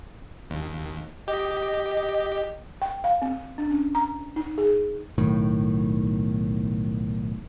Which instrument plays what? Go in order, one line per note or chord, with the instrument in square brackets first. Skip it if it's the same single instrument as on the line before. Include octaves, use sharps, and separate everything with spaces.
[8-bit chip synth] D#2
[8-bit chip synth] G4 [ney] D#5
[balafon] G5
F5
C4
D4
C#4
A#5
D#4
G#4
[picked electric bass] B1 A2 D#3